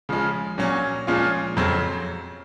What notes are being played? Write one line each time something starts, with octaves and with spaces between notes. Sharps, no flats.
C#3 F3 G#3
A#2 F#3 C#4
A#2 F3 G#3 C#4 F4
F2 C#3 F#3 C4